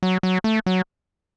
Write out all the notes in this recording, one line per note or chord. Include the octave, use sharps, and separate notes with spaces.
F#3
F#3
A3
F#3